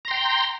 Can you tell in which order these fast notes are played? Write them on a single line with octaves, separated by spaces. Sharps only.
A#5 C6 G5